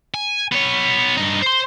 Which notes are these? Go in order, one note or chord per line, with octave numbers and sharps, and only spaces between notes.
G#5
B3 C#5
G2 D#4
C5 C6